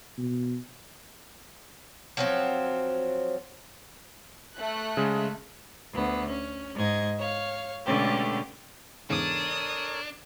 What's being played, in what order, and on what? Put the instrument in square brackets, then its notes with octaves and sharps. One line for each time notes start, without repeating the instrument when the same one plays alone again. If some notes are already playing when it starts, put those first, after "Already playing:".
[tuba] B2
[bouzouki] F3 F#3 C4
[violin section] A3 F#6
[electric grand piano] C#3 G#3
[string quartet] D2 B3
C#4
G#2 D#5 G#6
C#5 F5
B2 D3 G#3 A3 C#4 G4
[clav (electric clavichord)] E2 G#2 C#3 [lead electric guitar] D4 [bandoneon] A4 A#4 C#5 [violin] D#6